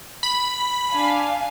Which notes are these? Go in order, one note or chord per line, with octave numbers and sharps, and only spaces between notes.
B5
D4 F5 G#5